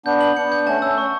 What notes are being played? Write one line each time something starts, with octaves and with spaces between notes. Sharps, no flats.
B3 D4 G6
F#7
B3 D4 C#7
G6
A3 C#4 A5
A3 C#4 E6
C#6